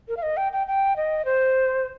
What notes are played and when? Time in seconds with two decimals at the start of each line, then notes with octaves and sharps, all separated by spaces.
0.08 A#4
0.17 F5
0.23 D#5
0.37 G5
0.52 G5
0.67 G5
0.96 D#5
1.25 C5